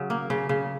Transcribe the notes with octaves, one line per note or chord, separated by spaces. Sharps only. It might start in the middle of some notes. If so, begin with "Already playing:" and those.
Already playing: C#3 F#3
A#3
C#3
C#3